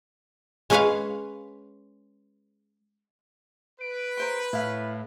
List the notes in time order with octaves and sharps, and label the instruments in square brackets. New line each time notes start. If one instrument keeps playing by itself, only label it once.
[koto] G#3 C#4 G#4 B4 C#5 F5
[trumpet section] B4 [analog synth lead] D7
[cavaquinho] A#4 C5 C6
[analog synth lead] A2 [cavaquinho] E4 F5